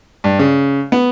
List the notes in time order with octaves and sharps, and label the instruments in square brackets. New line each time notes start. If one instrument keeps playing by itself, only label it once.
[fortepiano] G2
C#3
B3